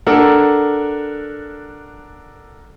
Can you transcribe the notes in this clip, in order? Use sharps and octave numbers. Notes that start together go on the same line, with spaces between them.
D4 A4 A#4 F#5